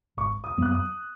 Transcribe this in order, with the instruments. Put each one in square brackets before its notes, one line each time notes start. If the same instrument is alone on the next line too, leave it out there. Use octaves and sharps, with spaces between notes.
[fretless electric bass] G#1 [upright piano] C#6
[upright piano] D#6
[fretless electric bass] F#2 F#3 B3 [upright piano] F#6
[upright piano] D#6